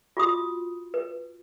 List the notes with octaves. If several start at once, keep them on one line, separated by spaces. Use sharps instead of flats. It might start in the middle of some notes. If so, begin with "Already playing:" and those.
F4 F#4 D#6
B4